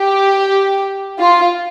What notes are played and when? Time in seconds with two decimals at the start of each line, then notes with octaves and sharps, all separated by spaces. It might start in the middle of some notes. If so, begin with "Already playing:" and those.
Already playing: G4
1.20 F4